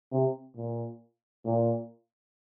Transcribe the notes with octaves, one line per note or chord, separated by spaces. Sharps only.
C3
A#2
A#2